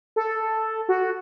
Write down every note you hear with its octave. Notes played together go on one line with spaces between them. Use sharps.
A4
F#4